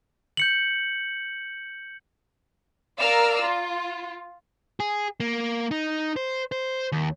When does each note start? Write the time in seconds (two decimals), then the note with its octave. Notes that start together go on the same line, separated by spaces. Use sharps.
0.37 G6 C#7 F#7
3.00 A#4 D5 F5 A#5 E6 F6
3.42 F4
4.80 G#4
5.20 A#3
5.71 D#4
6.16 C5
6.52 C5
6.92 D#2